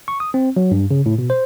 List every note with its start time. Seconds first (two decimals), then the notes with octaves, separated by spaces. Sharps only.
0.08 C#6
0.20 D#6
0.34 C4
0.56 F#3
0.71 G2
0.91 C#3
1.06 A2
1.19 B2
1.30 C5